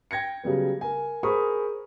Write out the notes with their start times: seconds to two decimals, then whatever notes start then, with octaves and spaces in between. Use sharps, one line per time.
0.11 G5 G#6 A#6 C#7
0.44 C#3 F#3 G3 B3
0.81 A#4 G#5
1.23 G#4 A#4 C5 B5 C#6 D#6